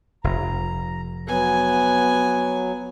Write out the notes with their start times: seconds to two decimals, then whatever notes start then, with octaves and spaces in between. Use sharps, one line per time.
0.24 F1 A#5
1.27 F#3 B3 G#5